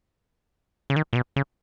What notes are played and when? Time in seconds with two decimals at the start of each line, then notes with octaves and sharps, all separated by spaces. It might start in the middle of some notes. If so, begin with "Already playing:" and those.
0.90 C#3
0.96 D#3
1.13 A#2
1.15 B2
1.36 C#3